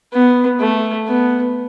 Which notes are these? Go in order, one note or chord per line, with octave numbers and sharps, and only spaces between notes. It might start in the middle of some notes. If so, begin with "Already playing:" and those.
B3
A3
B3